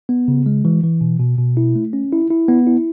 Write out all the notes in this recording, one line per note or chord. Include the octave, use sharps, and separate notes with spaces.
B3
C#3
G#3
E3
E3
B2
B2
B2
E4
A3
C#4
E4
E4
B3
E4